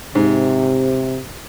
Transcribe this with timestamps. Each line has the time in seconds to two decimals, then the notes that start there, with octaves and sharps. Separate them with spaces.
0.15 G#2 C3